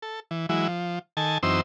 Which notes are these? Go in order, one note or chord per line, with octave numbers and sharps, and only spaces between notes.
A4
E3
E3 F#3 G#3 E4
F3
D#3 A4 G#5 A5
F#2 E3 C4 D#4 C5 E6